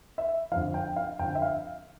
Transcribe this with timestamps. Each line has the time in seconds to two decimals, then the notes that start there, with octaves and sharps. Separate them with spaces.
0.18 E5
0.51 F2 D3 F3 F5
0.74 G5
0.96 F5
1.19 F2 D3 F3 G5
1.35 E5
1.42 F5